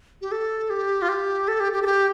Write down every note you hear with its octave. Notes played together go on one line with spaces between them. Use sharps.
G4
A4
G4
F4
G4
A4
G4
G4
A4
G4